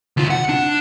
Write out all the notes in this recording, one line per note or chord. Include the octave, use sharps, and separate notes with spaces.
D2 F4
F#5
D4